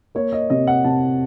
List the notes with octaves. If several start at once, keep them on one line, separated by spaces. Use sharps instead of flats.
A#3 C#5
D#5
C3 D#5
F#5
C3 A5